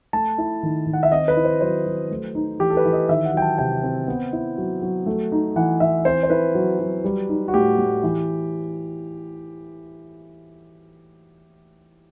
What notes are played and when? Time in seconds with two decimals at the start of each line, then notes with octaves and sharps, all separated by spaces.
0.13 A3 A5
0.38 E4
0.63 D#3
0.87 D#3
0.93 F#5
1.03 E5
1.11 C4 D#5
1.28 B4
1.37 E4
1.45 C5
1.61 F#3 C5
1.86 F#3
2.11 A3
2.35 D#4
2.59 E3 G4
2.70 A4
2.77 B4
2.85 E3
2.93 D#5
3.09 D#3 E5
3.25 F#5
3.34 F#3 G5
3.42 A5
3.58 C3 G5
3.83 C4
4.08 B3
4.33 E4
4.58 F#3
4.82 F#3
5.06 A3
5.32 D#4
5.56 E3 F#5
5.80 E3 E5
6.05 C4 C5
6.23 C5
6.30 E4 B4
6.55 F#3
6.79 F#3
7.04 G3
7.29 D#4
7.48 F#4
7.54 A2 G4
7.78 A2
8.03 E3